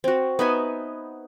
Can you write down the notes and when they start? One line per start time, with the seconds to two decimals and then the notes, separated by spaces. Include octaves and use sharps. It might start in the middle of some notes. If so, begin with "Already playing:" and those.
0.04 C4 F#4
0.39 B3 D#4 E5 G#5